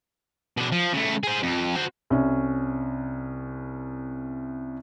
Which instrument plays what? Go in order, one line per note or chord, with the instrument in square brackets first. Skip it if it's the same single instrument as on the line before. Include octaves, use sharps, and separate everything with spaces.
[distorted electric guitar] B2 D4
F3
C#3 A3
G#4 C5
F2
F#4 C5
[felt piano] C2 C#4